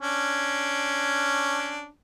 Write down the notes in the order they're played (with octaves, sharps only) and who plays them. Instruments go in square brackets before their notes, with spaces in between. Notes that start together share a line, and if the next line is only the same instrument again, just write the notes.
[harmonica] C#4 D4